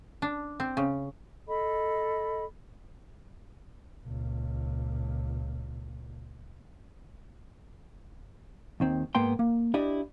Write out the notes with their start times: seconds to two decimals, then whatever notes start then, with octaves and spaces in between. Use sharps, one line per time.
0.22 D4
0.60 C4
0.77 C#3
1.48 A4 D#5 B5
4.03 C#2 A#2
8.80 D#2 D#3 C4
9.15 G#2 A#3 B3 G5 C6
9.39 A#3
9.74 D4 E4 G4 D5 D#5